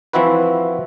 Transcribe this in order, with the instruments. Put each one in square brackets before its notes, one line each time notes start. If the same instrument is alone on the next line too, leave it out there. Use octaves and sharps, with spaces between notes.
[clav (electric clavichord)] E3 F3 C4 E4 F#4 B4